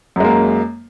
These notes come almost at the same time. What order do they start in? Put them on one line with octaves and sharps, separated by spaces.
F#2 G#3 A#3